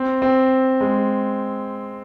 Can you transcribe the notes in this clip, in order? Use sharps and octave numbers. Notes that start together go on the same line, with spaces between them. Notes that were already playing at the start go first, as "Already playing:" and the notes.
Already playing: C4
C4
G#3